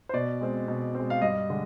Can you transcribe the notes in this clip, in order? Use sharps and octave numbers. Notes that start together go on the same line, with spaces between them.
C5
B2 D5
G#3 C4
B2
G#3 C4
F5
G2 D#5
D3 G#3